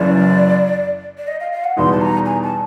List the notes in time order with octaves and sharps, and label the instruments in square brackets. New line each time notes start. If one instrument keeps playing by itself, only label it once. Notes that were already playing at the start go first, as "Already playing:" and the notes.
Already playing: [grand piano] F#1 F#2 C#3 E3 [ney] D5
[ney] D5
D#5
F5
F5
F#5
[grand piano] E2 B2 G3 B3 D#4 [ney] C6
[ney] A5
A#5
G#5
A5